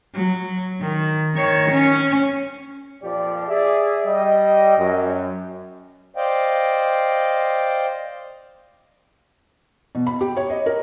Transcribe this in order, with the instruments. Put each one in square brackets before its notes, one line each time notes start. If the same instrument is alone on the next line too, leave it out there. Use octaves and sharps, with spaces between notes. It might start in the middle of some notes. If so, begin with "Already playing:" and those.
[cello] F#3
D#3
D#3 C#5
C#4
[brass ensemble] F2 A#2 F3 G4 D5
G#4 D5 E5
G3 D#5 G5
F#2
[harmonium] C5 D5 D#5 F5 G5
[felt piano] B2
B5
G4
C#5
D#5
A#4